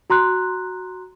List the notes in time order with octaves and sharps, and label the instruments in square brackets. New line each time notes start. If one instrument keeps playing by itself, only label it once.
[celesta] F#4 A#5 C6 F#6